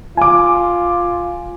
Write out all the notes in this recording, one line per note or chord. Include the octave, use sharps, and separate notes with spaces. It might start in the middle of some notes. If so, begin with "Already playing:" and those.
F4 G#5 D6